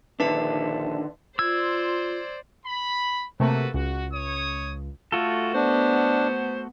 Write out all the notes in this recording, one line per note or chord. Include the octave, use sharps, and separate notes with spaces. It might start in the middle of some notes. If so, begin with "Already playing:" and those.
A#1 D3 D#3 D4 B4 E5 A5
F4 C5 D5 E6 G#6
B5
C3 A3 A#3 F#4 A4 B4
C#2 F#4
C#5 D#6
A3 F4 F#4 A4
B3 D4 C5